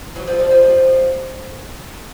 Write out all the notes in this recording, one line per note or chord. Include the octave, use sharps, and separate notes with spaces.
E3 F#3
F3 G3
F3 G3
F3 G3
F3 G3